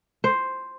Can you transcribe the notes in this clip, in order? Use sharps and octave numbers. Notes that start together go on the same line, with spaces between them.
C5